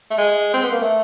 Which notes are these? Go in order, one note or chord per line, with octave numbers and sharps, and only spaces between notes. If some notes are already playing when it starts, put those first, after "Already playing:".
A3
G#3
C4
B3
A#3
A3